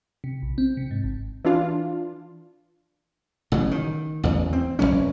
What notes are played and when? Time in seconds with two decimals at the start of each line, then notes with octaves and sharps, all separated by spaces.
0.24 C3
0.42 A#1
0.58 C4
0.77 C3
0.91 G#2
1.04 G#1
1.45 E3 D4 F4
3.52 A1 C#3 F#3
3.71 D#3
4.23 A1 E2
4.53 C4
4.79 F1 E2 F#3 C#4